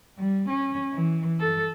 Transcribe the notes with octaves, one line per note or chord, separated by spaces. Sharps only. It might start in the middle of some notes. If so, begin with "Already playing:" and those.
G3
C#4
E3
A4